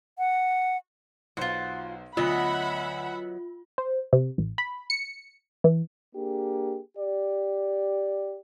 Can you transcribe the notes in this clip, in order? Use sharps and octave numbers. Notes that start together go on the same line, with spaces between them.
F#5
B1 F4 C5 F#5
D2 F#3 B3 F4 D#5 E5 F#5 B5
C5
C3
A1
B5
C#7
E3
A#3 D4 G4 G#4
G4 D5